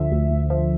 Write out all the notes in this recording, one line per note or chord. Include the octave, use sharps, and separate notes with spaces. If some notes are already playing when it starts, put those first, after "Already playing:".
Already playing: D2 D3 F3 E5
D2
D2
F3